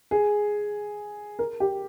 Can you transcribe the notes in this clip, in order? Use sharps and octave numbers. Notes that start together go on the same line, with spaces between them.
G#4
A#4
G4